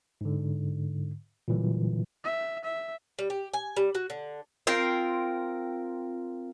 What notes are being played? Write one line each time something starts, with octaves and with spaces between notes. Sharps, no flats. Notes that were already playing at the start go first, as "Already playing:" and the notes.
G#2 D3
A#2 D3 E3 F#3 G3
E5
E5
G3
G4
G#5
G3
F#4
D3
C4 F4 A#4 G5